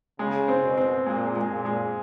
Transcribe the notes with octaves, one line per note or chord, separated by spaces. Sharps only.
C#3 G#3
C4
B2
C4
A#2 G#3
G#3
A#2
G#3